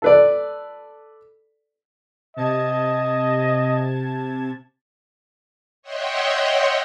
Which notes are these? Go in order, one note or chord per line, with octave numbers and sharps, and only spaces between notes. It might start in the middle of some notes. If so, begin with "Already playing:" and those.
A4 B4 D5
C3 D#5 A5 G#6
C#5 D#5 E5 F#5 G5 C6